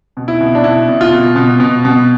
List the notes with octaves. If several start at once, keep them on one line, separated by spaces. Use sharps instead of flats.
B2
E4
B2
D4
B2 E4
B2
F4
B2
B2
B2
B2